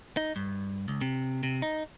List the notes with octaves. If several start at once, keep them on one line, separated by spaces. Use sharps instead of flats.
D#4
G2
C#2
C3
C3
D#4